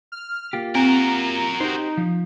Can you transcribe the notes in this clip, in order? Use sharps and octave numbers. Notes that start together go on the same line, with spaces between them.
F6
A#3 F4 G4
C4 F#4 A#4 A#5
D#4 G4 C5
F3